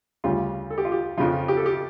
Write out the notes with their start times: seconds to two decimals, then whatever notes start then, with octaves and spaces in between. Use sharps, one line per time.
0.24 D2 C#3 G3 F4
0.70 A4
0.78 G4
0.85 F4
0.92 G4
1.17 F2 C#3 F3 F4
1.48 G4
1.57 A4
1.66 G4